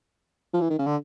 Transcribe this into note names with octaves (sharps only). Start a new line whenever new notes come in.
F3
E3
D#3
C#3
D3